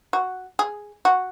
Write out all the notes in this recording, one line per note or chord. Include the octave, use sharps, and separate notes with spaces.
F#4
G#4
F#4